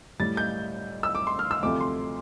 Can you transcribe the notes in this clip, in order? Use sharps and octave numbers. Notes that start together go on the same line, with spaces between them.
A2 G3 A6
G6
E6
D6
C6
F6
E6
D2 C3 F3 A3 D6
C6